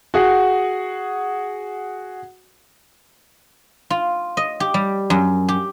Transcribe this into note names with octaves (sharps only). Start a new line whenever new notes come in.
F#4 G#4 F#5
F4
D#5
G4
G3
F#2
G4